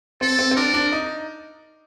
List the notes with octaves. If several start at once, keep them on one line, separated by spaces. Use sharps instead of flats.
C4 A4
C4
C4
D4 A#4
D4
D#4